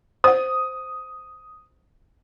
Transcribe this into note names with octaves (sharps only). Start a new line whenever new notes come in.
C5 F#5 D#6